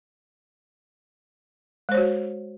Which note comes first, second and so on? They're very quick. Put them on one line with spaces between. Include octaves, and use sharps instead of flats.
G#3 C5 C#5 F#4